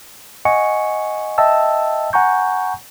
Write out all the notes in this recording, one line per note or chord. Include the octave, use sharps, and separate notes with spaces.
D#5 F#5 G#5 C#6 C#7
D#5 E5 G5 A5 E6
F#5 G#5 A#5 C#6 G6